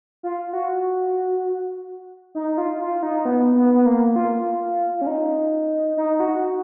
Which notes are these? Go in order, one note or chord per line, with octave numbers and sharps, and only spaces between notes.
F4
F#4
D#4
F4
F4
D#4
B3
B3
B3
A#3
F4
C#4
D#4
D#4
F#4